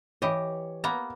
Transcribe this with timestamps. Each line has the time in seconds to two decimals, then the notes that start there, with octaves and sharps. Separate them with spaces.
0.22 E3 G4 C#5 D#5
0.84 A#3 B3 A#5